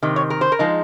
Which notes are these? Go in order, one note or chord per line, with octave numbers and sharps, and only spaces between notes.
C3 D#3
C#5
A#4
C5
A#4
F3 G#3 D#4